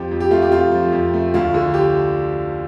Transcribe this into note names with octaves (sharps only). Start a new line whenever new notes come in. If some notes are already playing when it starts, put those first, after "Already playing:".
Already playing: F2 F3 G4
F2
G4
A3 F4
G4
F2 F4
F3
F2
A3
D2 F4
D3
G4